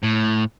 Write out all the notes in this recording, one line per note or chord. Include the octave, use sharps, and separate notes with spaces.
A2